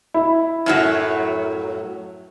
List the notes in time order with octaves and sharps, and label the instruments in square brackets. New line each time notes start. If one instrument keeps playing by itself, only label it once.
[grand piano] E4
[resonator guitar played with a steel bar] F#2 A2 F#3